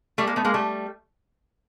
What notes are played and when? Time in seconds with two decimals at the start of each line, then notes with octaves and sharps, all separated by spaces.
0.18 G3 A3
0.27 G#3 A#3
0.36 A3 B3
0.45 G#3 A#3
0.54 G3 A3